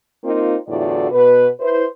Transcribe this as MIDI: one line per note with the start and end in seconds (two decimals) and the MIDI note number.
0.25 0.55 58
0.25 0.55 60
0.25 0.55 63
0.25 0.55 65
0.69 1.11 40
0.69 1.11 45
0.69 1.11 50
0.69 1.11 65
0.69 1.11 66
0.69 1.11 74
1.12 1.48 47
1.12 1.48 71
1.60 1.84 64
1.60 1.84 71
1.60 1.84 72